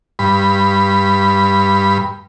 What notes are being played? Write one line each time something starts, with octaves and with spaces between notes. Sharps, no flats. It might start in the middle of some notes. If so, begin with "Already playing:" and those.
G2 B5